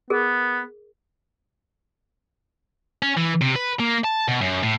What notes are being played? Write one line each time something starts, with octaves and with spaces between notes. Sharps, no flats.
B3 G#4 A#4
C#4
E3
C3
B4
A#3
A5
B2
F#2
A2